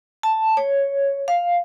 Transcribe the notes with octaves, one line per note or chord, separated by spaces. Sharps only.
A5
C#5
F5